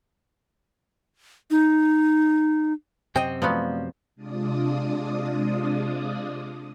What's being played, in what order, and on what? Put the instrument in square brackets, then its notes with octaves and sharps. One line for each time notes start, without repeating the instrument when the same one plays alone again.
[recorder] D#4
[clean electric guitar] F#2 C3 C4 [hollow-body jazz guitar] D#5 G5
[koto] F3 F#3 B3 [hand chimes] A3 D5 F5
[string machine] C3 G#3 D4 F4 D5 D#6